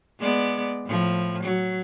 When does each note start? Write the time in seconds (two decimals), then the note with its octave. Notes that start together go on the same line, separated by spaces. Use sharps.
0.20 G#3 B3 D5
0.86 A2 F3
1.44 F#3